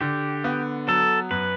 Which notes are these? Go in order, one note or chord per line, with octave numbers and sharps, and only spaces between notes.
D3 G4
B3
F#3 A4
F#2 B4